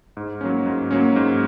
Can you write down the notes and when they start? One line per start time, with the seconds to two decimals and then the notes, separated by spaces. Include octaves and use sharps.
0.17 G#2
0.41 F#3 A#3 C#4
0.66 G#2
0.91 F#3 A#3 C#4
1.16 G#2